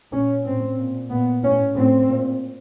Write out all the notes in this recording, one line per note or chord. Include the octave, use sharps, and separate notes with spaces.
A#2 C#4
A2 C4
A#2
A#2 B3
A2 C#4
A2 C4
A#2